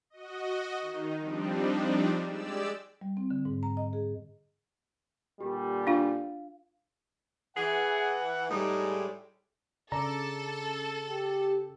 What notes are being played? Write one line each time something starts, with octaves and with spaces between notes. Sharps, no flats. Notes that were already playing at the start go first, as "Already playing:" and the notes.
F#4 D#5
D#3 D#4
F3 G3 C4 D4 D#4
G#3 G4 D5 E6
G3
C4
D3
G#2
A#5
D#5
G#4
A#2 D3 G3 G4
D4 F4 F5
E3 G#4 F#5
A2 G3 G#3 D#4
C#3 A4 D5 A#5
G4